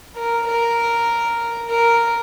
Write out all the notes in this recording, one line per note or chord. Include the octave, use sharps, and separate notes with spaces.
A#4
A#4
A#4